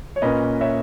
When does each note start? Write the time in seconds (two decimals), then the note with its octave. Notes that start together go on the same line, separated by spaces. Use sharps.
0.16 C#5
0.22 A#2 A#3 C#4 B4 D#5
0.61 C#5 E5